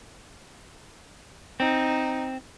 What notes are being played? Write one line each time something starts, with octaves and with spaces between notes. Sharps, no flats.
C4 D#4